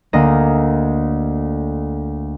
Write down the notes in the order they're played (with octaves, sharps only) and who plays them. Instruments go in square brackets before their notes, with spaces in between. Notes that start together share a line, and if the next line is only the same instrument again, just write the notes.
[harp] D2 A#3 D#5